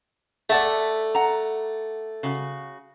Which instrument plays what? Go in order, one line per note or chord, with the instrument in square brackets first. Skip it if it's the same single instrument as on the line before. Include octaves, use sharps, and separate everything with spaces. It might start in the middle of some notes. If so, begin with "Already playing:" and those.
[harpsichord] A3 A4 D5 [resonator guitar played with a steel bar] E5 F#5
[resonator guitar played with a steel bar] F#5 A#5
C#3 F#4